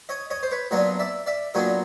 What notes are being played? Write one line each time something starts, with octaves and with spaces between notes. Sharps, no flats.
C#5 D#5
C#5 D#5
C5
B4 C#5
A#2 F#3 B3 D4 C#5 D#5
D5 E5
D5 E5
A#2 F#3 B3 D4 C#5 D#5